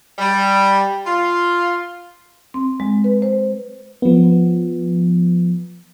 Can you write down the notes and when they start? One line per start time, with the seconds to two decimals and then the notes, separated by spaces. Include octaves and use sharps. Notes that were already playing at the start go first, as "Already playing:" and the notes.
0.18 G3
1.06 F4
2.54 C4
2.80 G#3
3.04 B4
3.22 C5
4.02 F3 B3